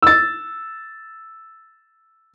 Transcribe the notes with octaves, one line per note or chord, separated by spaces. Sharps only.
E6 A6